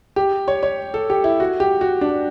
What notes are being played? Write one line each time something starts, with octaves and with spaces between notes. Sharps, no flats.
G4
C#5
C#5
A4
G4
E4
F#4
G4
F#4
D4